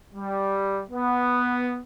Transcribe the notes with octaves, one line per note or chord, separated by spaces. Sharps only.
G3
B3